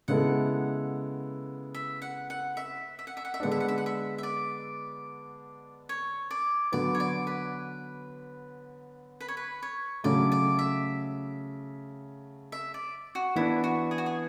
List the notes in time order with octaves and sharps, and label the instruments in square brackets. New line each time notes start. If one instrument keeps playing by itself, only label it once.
[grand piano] C#3 G#3 B3 E4 A4 [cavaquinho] F#5
[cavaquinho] E5
F#5
F#5
E5
E5
F#5
E5
F#5
E5
[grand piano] D3 G#3 B3 D4 [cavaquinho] F#5
[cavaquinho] E5
F#5
E5
F#5
E5
E5
D5
C#5
D5
[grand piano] D3 F#3 B3 [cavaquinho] D5
[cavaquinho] C#5
D5
B4
B4
C#5
B4
C#5
[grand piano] C#3 F#3 A3 [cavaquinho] D5
[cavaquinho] D5
E5
E5
D5
F#4
[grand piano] E3 B3 D4 [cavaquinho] E4
[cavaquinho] F#4
G#4
F#4
G#4